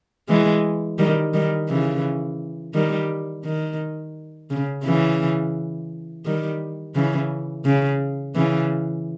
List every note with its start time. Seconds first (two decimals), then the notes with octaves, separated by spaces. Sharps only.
0.29 E3 G#3
0.99 D#3 G3
1.34 D#3 G3
1.69 C#3 E3
2.74 D#3 G3
3.45 D#3
4.50 C#3
4.85 C#3 E3
6.25 D#3 G3
6.95 C#3 E3
7.65 C#3
8.35 C#3 E3